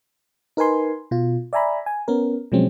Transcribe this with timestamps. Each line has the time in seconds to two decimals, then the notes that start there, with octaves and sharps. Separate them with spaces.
0.57 D#4 A#4 B4 G#5 C6
1.11 B2 F4
1.53 D5 E5 G#5 A#5 B5
1.86 G#5
2.08 B3 C#4 A#4
2.52 B2 F3 F#3 G#3 C4 C#4